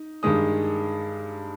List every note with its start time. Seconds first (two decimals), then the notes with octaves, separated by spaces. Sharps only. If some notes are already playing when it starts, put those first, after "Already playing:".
Already playing: D#4
0.23 G2 D#3 G#3 D#6